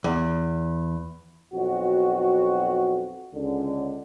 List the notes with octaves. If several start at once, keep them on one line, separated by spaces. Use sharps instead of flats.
E2
B1 F2 F#4
C#2 D3